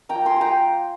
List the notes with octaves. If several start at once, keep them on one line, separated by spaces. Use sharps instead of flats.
A#3 F4 G5 A#5
G#5 C6
G5 A#5 C6